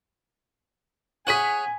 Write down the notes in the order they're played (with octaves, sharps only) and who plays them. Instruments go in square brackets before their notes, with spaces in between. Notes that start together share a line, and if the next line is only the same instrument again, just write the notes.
[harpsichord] G#4 C#5 F#5 [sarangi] G#5 [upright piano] B6 D#7 F#7